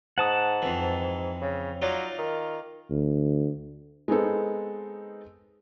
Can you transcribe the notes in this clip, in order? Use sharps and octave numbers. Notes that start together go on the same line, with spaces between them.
G#2 F#5 A5 D#6
F2 E3
G#2
C#3
F#3 D#4 F4 D5
D#3
D2
G#3 B3 C4 D#4 A4